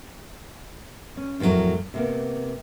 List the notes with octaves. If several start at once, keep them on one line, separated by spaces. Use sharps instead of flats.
C#4
F2 A2 D#3 F#3 A#4
C3 A#3 B3